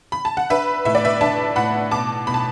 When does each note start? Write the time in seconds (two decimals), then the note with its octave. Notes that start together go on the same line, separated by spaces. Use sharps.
0.12 B5
0.25 A5
0.37 F#5
0.50 D4 B4 E5
0.85 A2 E5
0.95 D5
1.05 B4 E5
1.21 D4 E5 A5
1.56 A2 F#5 B5
1.91 B2 A5 D6
2.27 B2 B5
2.34 A5